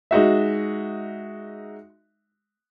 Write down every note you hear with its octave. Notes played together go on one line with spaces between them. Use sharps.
G#3 D#4 F#4 E5